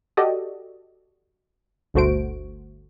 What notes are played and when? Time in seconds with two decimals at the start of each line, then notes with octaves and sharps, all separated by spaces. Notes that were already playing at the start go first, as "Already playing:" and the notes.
0.17 F#4 G4 A4 D5 D#5
1.94 G1 D2 A3 F#4 C5 D7